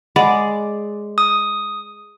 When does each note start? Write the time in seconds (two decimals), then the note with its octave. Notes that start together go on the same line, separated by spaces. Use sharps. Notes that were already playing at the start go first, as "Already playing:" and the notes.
0.16 G#3 D5 D#5 F#5 B5
1.18 D#6